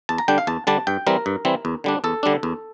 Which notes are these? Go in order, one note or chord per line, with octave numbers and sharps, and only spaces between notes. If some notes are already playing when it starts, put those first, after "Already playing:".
E2 A5
A#5
D3 G3 D4 G5
F5
E2 A5
D3 G3 D4 A5
G2 G5
E3 G3 C4 A#4
G2
E3 G3 C4
E2
D3 G3 D4
E2 A4
D3 G3 D4
E2